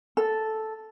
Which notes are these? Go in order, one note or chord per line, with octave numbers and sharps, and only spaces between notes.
A4